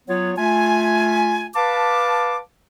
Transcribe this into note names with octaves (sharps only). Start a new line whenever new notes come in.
F#3 B3 F4 C#5
A3 F4 G#5
B4 F5 A5 D6